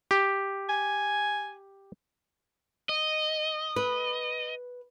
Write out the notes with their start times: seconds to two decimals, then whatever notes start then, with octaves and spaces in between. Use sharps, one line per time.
0.11 G4
0.69 G#5
2.89 D#5
3.76 B4